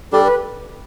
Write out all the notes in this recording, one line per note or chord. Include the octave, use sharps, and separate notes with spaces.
G3 D4 G4 A4 D5
B4